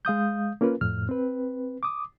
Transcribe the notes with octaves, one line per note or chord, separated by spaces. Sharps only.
G#3 F5 D#6 G6
A#3 C#4 F4 A#4 B4
F2 A2 F6
C4 B4
D6 D#6